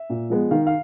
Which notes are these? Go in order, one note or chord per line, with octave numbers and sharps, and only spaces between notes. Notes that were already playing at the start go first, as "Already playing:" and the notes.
Already playing: E5
A#2
F3 G#3 B3
D#3 F5
F5